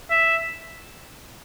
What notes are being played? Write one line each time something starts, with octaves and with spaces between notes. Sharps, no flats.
E5